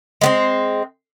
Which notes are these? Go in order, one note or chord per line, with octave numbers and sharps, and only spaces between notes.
G#3 B3 C4